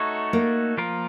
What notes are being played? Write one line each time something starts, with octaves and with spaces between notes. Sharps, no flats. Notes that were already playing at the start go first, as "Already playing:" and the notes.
Already playing: A3 D#4 F#4 A4 C#5
A#3
F3 A#3 F4 A#4